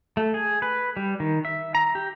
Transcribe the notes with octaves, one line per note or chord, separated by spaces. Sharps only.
A3
G#4
B4
G3
D#3
E5
A#5
G4